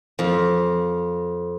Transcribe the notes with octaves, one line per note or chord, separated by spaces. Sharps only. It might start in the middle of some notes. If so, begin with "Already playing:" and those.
F2